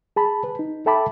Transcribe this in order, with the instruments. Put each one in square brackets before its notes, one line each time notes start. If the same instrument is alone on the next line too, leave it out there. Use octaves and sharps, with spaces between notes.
[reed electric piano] G#4 A5 B5
B4
D#4
A4 E5 G5 A5 B5 D6